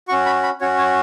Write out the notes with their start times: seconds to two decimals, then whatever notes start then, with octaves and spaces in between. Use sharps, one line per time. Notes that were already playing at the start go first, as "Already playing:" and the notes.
0.08 F#4 C#6
0.12 C#4
0.26 B5
0.43 B5
0.61 C#4 F#4 C#5
0.78 C#5